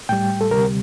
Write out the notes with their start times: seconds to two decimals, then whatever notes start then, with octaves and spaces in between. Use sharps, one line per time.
0.09 A2 G3 G5
0.41 A4
0.51 D2 C3 G3 A#4